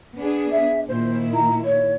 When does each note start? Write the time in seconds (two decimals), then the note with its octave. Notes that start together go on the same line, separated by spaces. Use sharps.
0.16 B3 D4 G#4
0.51 E5
0.88 A#2 D#3 E4 C5
1.34 A#5
1.64 C#5